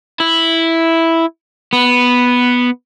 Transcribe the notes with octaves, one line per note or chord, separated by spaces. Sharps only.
E4
B3